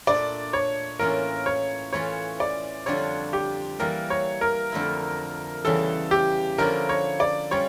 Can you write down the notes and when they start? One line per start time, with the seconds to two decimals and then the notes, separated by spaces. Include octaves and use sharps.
0.07 A#2 A3 D4 D5
0.53 C#5
0.99 A2 E3 A#3 C#4 F4 A#4
1.46 C#5
1.93 E3 A3 C#4 F4 C#5
2.40 D5
2.86 F2 D3 G3 D4 F4 C#5
3.33 G4
3.79 E3 G3 A#3 A#4
4.10 C#5
4.41 A#4
4.72 F2 D3 A3 E4
5.65 E2 C#3 E3 G3 A4
6.11 G4
6.58 D3 F3 A#3 C#4 E4 A#4
6.89 C#5
7.20 D5
7.51 G3 C#4 F4 C#5